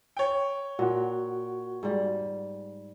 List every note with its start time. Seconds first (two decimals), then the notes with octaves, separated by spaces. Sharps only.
0.17 C#5 G5
0.79 A#2 F#4 F#5
1.83 G#2 G3